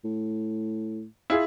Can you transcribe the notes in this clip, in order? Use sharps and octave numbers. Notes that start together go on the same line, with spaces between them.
A2
E4 F4 G#4